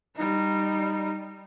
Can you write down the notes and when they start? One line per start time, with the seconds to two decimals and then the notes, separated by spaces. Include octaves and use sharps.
0.16 G3 D#4